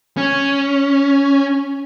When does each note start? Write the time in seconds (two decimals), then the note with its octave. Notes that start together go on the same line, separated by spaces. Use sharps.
0.17 C#4